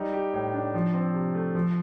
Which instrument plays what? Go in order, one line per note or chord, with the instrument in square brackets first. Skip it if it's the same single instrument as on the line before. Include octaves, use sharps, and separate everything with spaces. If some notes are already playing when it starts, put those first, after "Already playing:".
Already playing: [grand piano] G3 D#4
G4
A2
D4
F3
C4
C3
A3
F3